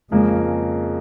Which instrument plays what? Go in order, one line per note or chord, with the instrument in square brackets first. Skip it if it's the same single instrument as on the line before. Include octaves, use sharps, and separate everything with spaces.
[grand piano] F2 C#3 F3 A#3 [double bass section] G#3